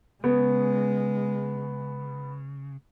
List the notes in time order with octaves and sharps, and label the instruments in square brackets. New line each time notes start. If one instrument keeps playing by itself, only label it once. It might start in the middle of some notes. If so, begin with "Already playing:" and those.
[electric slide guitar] C#3 [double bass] G#3 [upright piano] B3